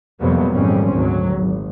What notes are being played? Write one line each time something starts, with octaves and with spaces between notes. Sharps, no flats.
F2 C3 F#3 G3 A#3 B3
G#1 F2 A#2 G3 C4 C#4
G#1 D2 F#3
G#1